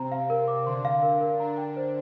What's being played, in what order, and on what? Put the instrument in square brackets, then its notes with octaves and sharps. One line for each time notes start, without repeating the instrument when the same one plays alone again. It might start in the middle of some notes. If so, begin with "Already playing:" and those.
Already playing: [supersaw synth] C3 C4 [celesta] A#5
[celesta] F5
A#4
D6
[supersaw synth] D3 D4 [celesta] C6
[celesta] F5
A#4
A#4
[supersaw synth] D3 D4 [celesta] A#5
[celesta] G5
C5